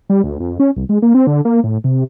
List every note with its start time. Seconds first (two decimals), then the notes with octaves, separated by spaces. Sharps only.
0.09 G3
0.24 D2
0.40 F2
0.60 C#4
0.76 C2
0.89 G#3
1.02 A#3
1.14 C4
1.27 D3
1.45 A#3
1.64 A2
1.84 C3